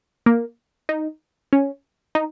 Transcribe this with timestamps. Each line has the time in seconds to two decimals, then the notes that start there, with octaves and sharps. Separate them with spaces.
0.26 A#3
0.89 D#4
1.53 C#4
2.15 D#4